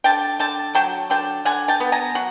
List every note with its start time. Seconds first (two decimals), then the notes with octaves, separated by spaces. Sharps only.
0.04 D3 G5 A5
0.39 D3 G5 A5
0.75 F#3 G5 A5
1.10 D3 G5 A5
1.45 D3 F#5 G#5
1.68 G5 A5
1.80 B3
1.92 G#5 A#5
2.15 F#3 F#5